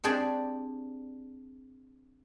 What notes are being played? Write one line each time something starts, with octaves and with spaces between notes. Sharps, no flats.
C4 D4 G4 G#4 D5